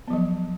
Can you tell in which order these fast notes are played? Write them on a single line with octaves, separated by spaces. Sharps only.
B3 F3 F#3